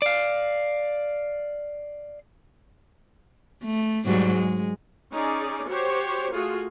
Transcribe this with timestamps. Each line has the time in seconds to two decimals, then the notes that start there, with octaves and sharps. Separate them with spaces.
0.02 D5 F5
3.64 A3
4.05 G#2 F#3 G3
4.35 G#3
5.10 C#4 D#4 G#4 D5
5.67 F#4 G4 C5 C#5
6.31 A3 F4 F#4 G#4